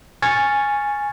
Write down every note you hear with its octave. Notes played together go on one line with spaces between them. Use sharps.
G#5 C#6 F6 G#6 A6